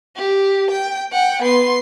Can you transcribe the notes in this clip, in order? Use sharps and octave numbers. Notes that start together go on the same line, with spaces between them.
G4
G5
F#5 G5
B3 C6